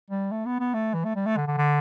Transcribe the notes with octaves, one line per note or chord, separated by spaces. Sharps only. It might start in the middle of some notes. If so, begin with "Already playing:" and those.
G3
A3
B3
B3
A3
E3
A3
G3
A3
D3
D3
D3